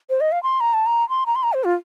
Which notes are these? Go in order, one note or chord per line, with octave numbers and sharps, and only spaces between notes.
C5
D#5
F5
C6
A#5
A5
A#5
C6
A#5
C6
A#5
C5
F4